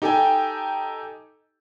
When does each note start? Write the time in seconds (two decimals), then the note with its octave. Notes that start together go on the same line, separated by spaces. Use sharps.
0.02 D#4 G4 A4 G5 G#5